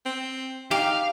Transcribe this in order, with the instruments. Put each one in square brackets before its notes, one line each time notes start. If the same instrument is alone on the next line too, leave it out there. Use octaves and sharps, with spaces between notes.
[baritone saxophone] C4
[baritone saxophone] D#4 [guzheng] G4 [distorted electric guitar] F5